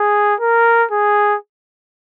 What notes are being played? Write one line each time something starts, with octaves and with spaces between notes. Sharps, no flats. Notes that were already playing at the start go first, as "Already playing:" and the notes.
Already playing: G#4
A#4
G#4